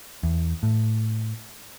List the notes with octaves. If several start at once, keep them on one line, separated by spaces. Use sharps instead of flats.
E2
A2